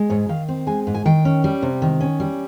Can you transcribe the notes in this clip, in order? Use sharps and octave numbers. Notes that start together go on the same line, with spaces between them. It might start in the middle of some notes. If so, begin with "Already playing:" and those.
Already playing: G#3
G#2 C#5
D#3 F5
C4
G#3 G#5
G#2
G#5
D#3 G5
C#4
G3
C3
D#3
C#4
G3